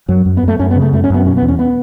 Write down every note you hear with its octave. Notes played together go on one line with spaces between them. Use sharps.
F#2 F#3
F#2
B3
F#2
A3
F#2 C#4
B3
C#3
A3
F#2 A3
C#4
F#2 B3
B2 C#4
B3
E2
C#4
B3